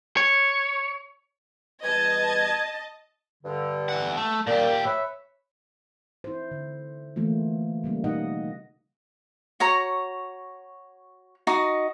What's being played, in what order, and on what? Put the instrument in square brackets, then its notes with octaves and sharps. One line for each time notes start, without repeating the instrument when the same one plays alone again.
[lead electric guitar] C#5
[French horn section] E2 G3 B4 [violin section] D#5 A5 [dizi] G#6
[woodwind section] G2 D3
[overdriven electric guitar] E3 F#5
A3
[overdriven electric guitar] A#2 G4 [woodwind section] A#3 D5
[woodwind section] B4 C#5 E5
[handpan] E4 C5
D3
E3 A3 A#3 F4
C#3 G3 A#3
B2 D#4 D#5 F#5
[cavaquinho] F#4 C#5 A#5
D#4 F#4 D#5